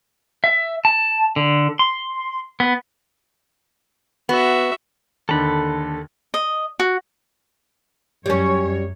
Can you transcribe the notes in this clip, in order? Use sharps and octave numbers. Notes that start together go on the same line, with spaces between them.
E5
A5
D3
C6
B3
B3 F#4 E5
D#2 D3 A4 B5
D#5
F#4
F#2 G3 C#4 C#5